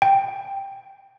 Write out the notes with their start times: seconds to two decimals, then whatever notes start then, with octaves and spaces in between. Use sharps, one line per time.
0.02 G5